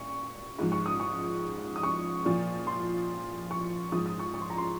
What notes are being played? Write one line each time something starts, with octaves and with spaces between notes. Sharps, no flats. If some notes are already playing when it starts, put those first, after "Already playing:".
Already playing: A#2 C#6
G#2 F3
C#6
D#6
C#6
D#6
C#6
A#2 F3
C6
C#6
G#2 F3 D#6
D#6
C#6
C#6
C6
A#5
C6